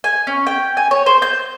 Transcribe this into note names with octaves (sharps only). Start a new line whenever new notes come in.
G#5
C#4
G5
G#5
C#5
C5
G6